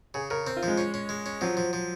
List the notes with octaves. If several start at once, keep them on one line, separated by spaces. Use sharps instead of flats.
C#3 G#4
C#3 A#4
C4
F4
F3 G#3
C#4
C#4
G#3
C#4
F3 F#3
F3
F3